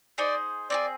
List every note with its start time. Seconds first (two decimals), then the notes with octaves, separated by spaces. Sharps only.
0.18 D#4 G#4 C5 D5
0.70 C4 D#4 G#4 D5